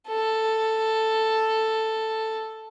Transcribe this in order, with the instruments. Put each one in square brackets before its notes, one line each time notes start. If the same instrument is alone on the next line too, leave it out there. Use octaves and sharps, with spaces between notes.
[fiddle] A4